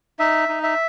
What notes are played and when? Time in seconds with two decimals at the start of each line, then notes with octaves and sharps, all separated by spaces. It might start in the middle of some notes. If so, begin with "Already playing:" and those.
0.19 D#4 E5
0.49 D#4
0.63 E5